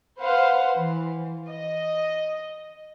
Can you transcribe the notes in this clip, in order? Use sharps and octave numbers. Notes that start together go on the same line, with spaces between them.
B4 C5 F5 F#5
E3
D#5